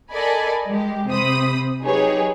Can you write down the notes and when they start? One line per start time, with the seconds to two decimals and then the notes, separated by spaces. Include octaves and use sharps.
0.11 A4 A#4 D5 D#5 G#5 B5
0.68 G#3 G4
1.09 C3 C5 B5 D#6
1.83 F#3 D#4 G4 G#4 B4 C#5